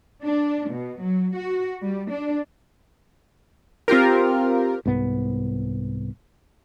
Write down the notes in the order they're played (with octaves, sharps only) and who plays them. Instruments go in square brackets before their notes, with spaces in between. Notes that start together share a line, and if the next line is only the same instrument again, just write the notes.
[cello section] D4
B2
F#3
F#4
G3
D4
[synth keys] C4 F4 G4 A#4
[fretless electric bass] C2 G#2 B3